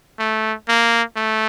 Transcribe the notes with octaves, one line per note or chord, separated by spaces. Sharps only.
A3
A#3
A3